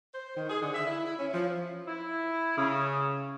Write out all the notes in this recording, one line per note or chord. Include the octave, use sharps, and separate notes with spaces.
C5
D#3
G#4
D3
E5
E4
E4
C#4
F3
E4
C#3